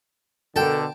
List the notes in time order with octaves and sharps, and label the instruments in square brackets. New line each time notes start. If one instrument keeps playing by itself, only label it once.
[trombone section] B2 D3 [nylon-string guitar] A4 A#4 [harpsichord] G5 A5